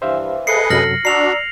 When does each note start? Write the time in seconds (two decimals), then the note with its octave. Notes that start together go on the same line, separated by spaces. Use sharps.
0.02 G2 E3 C5 E5 F5
0.47 G#4 A4 B4 D#5 C7 C#7
0.70 F#2 C3 F#3 F6 A#6 F#7
1.05 D4 F#4 D5 A#5 E6 C7 F7